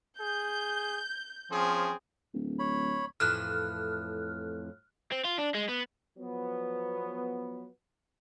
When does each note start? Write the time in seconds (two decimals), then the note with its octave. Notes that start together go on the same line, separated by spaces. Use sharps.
0.20 G#4 G6
1.51 F3 C4 C#4 G#4
2.34 D1
2.59 C#5 B5
3.20 F2 A2 E3 F6 F#6
5.12 C4
5.24 F4
5.38 D4
5.54 G#3
5.69 B3
6.17 F3 F#3 B3